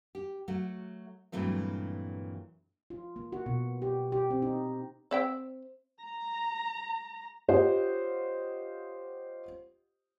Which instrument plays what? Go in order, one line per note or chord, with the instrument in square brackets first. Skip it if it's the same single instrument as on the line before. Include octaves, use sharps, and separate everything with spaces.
[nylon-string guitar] G4
F#3 A3 F#4
G2 A#2 E3 F#3 A3 C4
[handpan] F4
A#3
F#4
B2
G4
G4
C4
D#4
[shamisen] C4 E5 G5
[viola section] A#5
[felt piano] F4 G4 C5 C#5 D#5 F#5